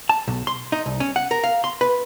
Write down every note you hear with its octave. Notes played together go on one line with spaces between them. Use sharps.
A5
B1
C6
D#4
C2
C#4
F#5
A#4
F5
C6
B4